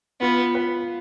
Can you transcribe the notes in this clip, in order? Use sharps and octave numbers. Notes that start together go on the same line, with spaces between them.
B3 F4
B4